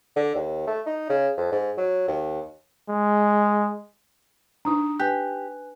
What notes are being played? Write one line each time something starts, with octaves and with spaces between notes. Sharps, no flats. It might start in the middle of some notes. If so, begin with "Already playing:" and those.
D3
D#2
A3
D#4
C#3
F2
G#2
F#3
D#2
G#3
D4 D#4 A#5 D#6
G4 B4 G#5 F#6